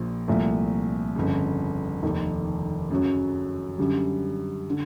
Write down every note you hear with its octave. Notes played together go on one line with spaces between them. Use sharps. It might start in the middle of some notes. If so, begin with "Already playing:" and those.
Already playing: A#1 A#2 F3
C2 A#2 F3 A3
G1 F2 C#3
F1 D#2 D#3
F#2 C#3 F#3
F#2 D3 G3
D3